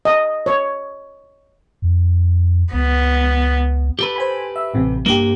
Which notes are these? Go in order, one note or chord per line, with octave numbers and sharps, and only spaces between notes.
D#5
C#5
F2
C#2 B3
G4 A4 B4
C5 G#5 B5
E5
A1 C3
G2 A#3 G4